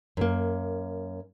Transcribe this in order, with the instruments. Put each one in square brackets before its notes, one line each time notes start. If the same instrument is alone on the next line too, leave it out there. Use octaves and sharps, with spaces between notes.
[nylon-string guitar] F#2 A#3